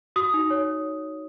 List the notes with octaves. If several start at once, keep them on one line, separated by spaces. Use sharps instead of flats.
F#4 D#6
D#4
C#5